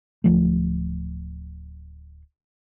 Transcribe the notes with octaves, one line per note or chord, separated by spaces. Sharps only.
D1 F3 A3